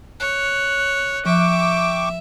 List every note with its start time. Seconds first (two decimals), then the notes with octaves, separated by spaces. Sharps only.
0.20 C#5 F#6
1.25 F3 E5 G5 C#6 D6